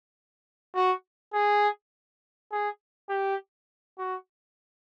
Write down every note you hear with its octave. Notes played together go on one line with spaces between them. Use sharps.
F#4
G#4
G#4
G4
F#4